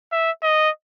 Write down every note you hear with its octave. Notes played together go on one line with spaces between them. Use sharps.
E5
D#5